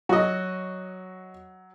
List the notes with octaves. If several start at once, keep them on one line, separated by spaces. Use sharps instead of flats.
F#3 F#4 D#5